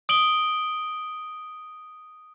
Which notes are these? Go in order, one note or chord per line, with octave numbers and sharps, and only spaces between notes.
D#6 D7 F#7 G7